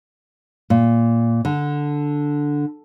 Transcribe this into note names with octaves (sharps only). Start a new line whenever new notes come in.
A#2
D3